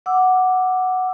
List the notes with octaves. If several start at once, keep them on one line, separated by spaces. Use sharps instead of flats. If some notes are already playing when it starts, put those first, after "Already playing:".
F#5 D6 E6